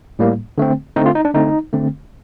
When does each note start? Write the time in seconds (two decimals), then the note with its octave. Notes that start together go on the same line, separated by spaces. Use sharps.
0.19 A2 G3 A#3
0.58 D3 A3 C4
0.96 D3 A3 C4 D#4
1.06 F4
1.15 D#4
1.25 D4
1.34 D3 A3 C4 D#4
1.73 D3 A3 C4